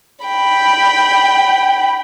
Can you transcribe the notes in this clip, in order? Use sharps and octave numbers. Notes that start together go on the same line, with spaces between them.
G5 B5